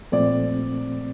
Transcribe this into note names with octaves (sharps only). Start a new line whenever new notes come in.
A#2 F3 A3 C4 D5